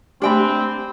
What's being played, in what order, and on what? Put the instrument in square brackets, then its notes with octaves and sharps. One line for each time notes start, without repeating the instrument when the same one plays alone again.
[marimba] A3 G4 [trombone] C4 [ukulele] D4 G5 B5